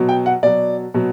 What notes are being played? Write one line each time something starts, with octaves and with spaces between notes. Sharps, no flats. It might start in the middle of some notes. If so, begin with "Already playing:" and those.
Already playing: B2 F#3
G5
F#5
B2 F#3 D5
B2 F#3